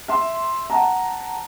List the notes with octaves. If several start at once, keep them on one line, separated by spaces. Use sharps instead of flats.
E5 C6
F#5 A5 A#5